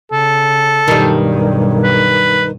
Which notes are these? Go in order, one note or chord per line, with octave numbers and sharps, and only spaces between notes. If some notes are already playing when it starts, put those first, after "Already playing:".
C#3 A4
B1 G2 D#3 G3
B4